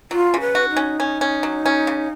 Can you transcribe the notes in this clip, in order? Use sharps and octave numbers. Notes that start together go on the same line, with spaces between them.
F#3 F4
C#3
B4
F#4
D#4
C#4
C#4
C#4
F#3
C#4
C#3